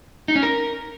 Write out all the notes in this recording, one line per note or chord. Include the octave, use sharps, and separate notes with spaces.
D#4
C#4
A#4